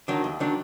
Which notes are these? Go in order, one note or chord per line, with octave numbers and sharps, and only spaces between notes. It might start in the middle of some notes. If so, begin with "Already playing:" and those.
D#3 F#3 D4
D#2
D#3 F#3 D4